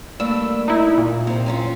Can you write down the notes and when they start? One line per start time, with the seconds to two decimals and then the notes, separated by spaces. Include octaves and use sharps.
0.20 G2 A3 A#3 E6
0.68 D#4 E4
0.98 A#2
1.27 C3 C4
1.46 F#2 C#4 F4